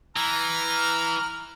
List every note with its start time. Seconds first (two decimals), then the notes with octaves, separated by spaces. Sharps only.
0.17 E3 A#5 F6